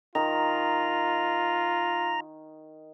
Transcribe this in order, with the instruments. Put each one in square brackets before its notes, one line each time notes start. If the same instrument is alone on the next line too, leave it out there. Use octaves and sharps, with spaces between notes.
[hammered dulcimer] D#3 [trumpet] F4 [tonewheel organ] A#5